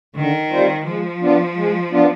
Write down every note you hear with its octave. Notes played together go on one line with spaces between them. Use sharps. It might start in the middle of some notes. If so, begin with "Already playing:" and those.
D3 D#3
G3 C4 F4 C5
F3 G#3
B3 D4 F4
G#3
B3 D4 F4